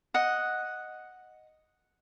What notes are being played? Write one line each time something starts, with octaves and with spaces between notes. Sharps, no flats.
D#5 F#5